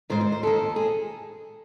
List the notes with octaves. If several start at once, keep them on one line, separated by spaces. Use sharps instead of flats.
G#2 D#3 C5
C5
C5
D#2 D#3 A4
G#4